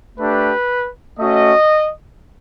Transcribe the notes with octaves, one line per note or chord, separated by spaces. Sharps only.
A3 D4 G4 B4
A3 C#4 F#4 D#5